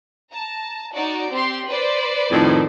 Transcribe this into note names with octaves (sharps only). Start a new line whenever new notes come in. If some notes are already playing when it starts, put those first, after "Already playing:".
A5 A#5
D#4 F#4 D5
C4 G4 C6
B4 C5 D5
F2 A2 D#3